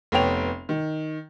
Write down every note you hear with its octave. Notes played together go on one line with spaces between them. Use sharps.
F1 B3 C#5 G5 F7
D#3